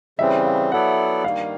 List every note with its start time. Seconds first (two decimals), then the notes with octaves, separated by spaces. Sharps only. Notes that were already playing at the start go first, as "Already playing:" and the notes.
0.19 C#3 E3 G3 C4 E5
0.45 F5
0.71 F#3 B3 E4 A4 D5 F#5
1.23 G2 D#3 G3 A#3 F5